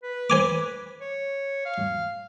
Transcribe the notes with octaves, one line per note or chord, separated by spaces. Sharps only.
B4
C5 G#5 D6
C#5
F5